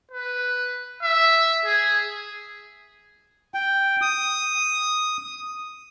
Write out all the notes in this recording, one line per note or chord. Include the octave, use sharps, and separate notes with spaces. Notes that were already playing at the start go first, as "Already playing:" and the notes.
B4
E5
G#4
G5
D#6